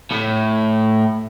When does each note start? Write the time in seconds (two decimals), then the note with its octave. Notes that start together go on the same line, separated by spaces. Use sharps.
0.11 A2